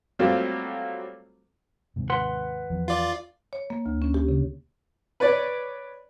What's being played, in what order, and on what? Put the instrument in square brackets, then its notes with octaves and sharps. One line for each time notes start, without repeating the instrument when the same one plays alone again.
[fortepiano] F#3 G3 A3 A#3 C4 F4
[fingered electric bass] D#2 G#2 C3
[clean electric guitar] B4 F#5 C6
[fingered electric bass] E2 F3
[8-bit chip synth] F4 D5
[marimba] C#5
A#3
D2
C#4
G4
C#3
[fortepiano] B4 C#5 D5